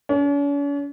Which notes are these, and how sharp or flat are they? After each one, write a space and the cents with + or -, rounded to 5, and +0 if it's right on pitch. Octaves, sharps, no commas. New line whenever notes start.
C#4 +45